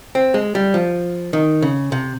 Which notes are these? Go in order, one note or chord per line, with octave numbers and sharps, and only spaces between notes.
C4
G#3
G3
F3
D#3
C#3
C3